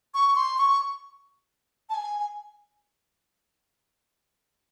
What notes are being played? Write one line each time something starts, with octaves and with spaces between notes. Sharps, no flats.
C#6
C6
C#6
A5
G#5
G#5